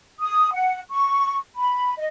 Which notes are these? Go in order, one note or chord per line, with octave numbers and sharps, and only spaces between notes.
D#6
F#5
C#6
B5
D#5